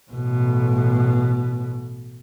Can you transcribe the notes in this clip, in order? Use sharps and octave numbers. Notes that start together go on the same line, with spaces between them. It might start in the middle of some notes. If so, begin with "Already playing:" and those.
A1 B2